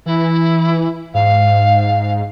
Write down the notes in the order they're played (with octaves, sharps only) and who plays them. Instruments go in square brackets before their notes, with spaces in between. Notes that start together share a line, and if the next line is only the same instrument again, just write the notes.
[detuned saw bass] E3 [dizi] E4
[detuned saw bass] G#2 [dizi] F5